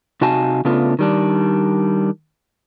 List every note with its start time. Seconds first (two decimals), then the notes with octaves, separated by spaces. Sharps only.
0.21 C3 D#4 F#4 F5 G#5 A5
0.65 C#3 A3 B3 D4 F4
0.99 D#3 G3 D4